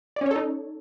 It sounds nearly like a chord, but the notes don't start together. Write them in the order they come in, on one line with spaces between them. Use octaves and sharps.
D5 C#4 C#5 A4 D#4